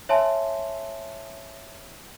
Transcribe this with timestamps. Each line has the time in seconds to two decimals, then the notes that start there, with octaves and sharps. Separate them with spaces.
0.09 C#5 E5 G#5 A5 C6